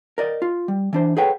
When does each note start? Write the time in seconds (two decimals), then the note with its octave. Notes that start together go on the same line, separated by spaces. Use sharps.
0.18 A#4 D5 D#5
0.42 F4
0.68 G3
0.93 E3 D4 C5
1.17 G#4 A4 B4 C#5 F#5 G5